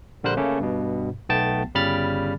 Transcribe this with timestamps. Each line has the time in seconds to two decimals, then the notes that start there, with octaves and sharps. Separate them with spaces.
0.24 A#1 D3 G3 A#4 C5 F#6
0.37 C#3 A3 A#3 C#4
0.60 G2 B2
1.29 B1 A3 B3 G5 A5 A6
1.75 G1 C#3 G3 B5 F6 A6